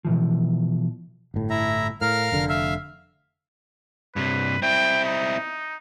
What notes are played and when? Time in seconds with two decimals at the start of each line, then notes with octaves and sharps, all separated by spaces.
0.05 B2 E3 F3
1.34 G1 A2
1.50 E4 E5 A#5
2.01 A2 A#4 F5 F6
2.32 F1 D3
2.49 E5 F5
4.16 G2 C3 B4
4.62 C4 E4 G5
5.05 D#4